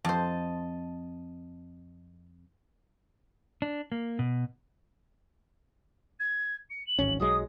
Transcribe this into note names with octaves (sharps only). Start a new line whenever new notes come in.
F2 C5 D#5 A5
D4
A#3
B2
G#6
C#7
F#7
D1 G#1 C#4
B1 F#3 G#3 D#6